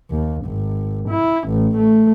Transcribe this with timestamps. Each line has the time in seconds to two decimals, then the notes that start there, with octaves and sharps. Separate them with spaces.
0.10 D#2
0.46 G#1
1.09 E4
1.49 A1
1.78 A3